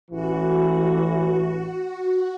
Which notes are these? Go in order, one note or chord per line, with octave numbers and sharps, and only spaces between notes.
A1 E3 F#4